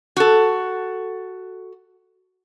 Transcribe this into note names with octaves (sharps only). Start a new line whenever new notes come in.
F#4 A4